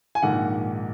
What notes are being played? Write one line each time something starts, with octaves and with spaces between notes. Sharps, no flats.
G#5
A#1 G#2 D#3 F#5